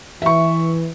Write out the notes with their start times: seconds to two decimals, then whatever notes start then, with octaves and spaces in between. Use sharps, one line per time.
0.22 E3 E5 C#6